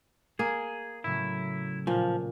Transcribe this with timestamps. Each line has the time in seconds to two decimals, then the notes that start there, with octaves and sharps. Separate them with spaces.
0.39 A#3 G#4
1.04 A2 C#3 F#3 E4
1.87 A#2 F3